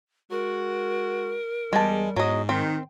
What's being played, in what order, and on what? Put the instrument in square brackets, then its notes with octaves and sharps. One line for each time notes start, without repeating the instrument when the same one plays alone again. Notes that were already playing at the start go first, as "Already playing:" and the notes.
[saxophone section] G#3 F#4 [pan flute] A#4
[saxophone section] E2 [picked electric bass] G3 [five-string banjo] G#3 A5
[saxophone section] E2 [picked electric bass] G#2 [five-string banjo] F#3 D#5
[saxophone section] D#3 [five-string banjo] C4